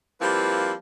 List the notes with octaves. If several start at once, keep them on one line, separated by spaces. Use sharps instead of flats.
F3 G3 A#3 C4 E4 B4